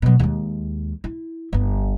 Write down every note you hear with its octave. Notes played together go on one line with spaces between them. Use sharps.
B2 F#3
D#2 G#3
E4
G1 B3